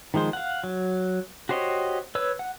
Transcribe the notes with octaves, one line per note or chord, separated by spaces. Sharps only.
D#3 F3 G#3 C5
F5 F#5
F#3
F#4 G4 C5 C#5 D#5
B4 C#5 E6
F#5